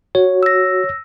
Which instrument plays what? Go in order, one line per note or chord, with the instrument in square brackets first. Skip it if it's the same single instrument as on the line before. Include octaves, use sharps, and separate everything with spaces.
[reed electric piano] F#4 [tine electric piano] C#5
[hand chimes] E6 A#6